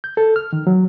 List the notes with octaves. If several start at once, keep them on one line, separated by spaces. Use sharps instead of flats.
G6
A4
F6
D#3
F#3